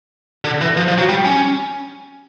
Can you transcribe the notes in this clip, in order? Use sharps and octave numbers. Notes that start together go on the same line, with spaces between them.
D3
E3
F3
F3
F#3
G3
C#4